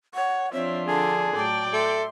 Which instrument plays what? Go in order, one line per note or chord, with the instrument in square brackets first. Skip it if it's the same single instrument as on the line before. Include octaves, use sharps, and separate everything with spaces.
[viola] C#5 [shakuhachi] F#5
[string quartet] F3 D4 F4 [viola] C4 E5 [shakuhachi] C#5
[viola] D3 [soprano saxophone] G#4 [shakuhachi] A5
[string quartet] A2 F#3 [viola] D5 G5 [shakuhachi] A5
[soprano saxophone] A4 [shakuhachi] E5 [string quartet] C6